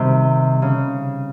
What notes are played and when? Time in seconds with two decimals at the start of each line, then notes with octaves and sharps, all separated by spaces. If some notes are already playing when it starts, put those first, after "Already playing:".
Already playing: C3 D#3 G3
0.62 C#3